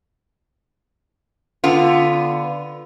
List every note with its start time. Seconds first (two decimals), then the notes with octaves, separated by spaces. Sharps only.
1.64 D3 B3 F4